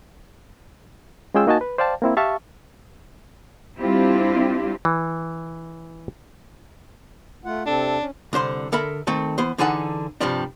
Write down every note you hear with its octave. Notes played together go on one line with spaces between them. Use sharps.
G#3 C#4 F4 G#4 G5 E6
A#3 D#4 F#4 D#5 G#5 A5
B4
C5 D5 F5 G5 A5
A#3 C4 E4
G4 E5 F5 A5 C#6
G3 C4 D4 E4 F4 G4
E3
A3 F4 F#5
C3 C4 D4 A4
C#4
C2 D3 C5 C6
D3 A4 A#4 E5 B5
D#3 A3 C4 A4
E3 B3 C5
D3 E3 D#4 G#4 A4 F#5
G2 C3 F3 G3 D4